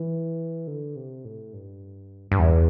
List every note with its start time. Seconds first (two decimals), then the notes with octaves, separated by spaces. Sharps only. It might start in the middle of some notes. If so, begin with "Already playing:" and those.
Already playing: E3
0.67 D3
0.96 C3
1.25 A2
1.53 G2
2.32 G2
2.39 E2